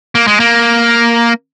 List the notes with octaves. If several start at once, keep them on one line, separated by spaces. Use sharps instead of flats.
A#3
G#3
A#3